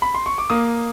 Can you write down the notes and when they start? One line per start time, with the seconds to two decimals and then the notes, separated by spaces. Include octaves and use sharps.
0.02 B5
0.15 C6
0.26 C#6
0.38 D6
0.50 A#3 D#6